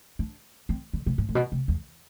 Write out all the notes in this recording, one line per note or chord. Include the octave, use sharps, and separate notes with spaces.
D4
C4
D3
C3
A2
A2
B2
C3
E2